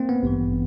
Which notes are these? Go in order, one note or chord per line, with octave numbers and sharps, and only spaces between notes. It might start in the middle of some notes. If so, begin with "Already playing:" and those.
Already playing: A#3 C4
B3
A1 G2 E3